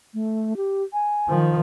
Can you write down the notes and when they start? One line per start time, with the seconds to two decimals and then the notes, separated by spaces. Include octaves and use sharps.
0.14 A3
0.56 G4
0.93 G#5
1.29 D#3 F3